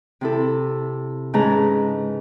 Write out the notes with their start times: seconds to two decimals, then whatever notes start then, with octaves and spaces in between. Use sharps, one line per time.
0.21 C3 E4 A4
1.34 G#2 C#3 G#3 B4 A5 A#5